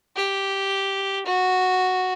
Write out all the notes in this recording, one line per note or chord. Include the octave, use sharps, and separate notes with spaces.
G4
F#4